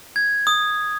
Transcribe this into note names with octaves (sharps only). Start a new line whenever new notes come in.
G#6
D#6